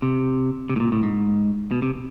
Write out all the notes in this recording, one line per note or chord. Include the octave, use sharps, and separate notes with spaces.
C3
C3
A2
A#2
A2
G#2
B2
C3